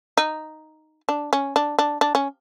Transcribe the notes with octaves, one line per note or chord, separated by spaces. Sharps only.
D#4
D4
C#4
D4
D4
D4
C#4